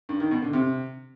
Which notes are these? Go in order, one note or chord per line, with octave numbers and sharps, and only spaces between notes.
G2
D#3
B2
D3
C3